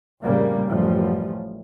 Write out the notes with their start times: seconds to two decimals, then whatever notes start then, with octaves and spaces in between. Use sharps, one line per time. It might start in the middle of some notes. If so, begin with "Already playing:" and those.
0.23 F2 A2 C#3 G3 A#3
0.67 A1 F#2 F3 G3 A3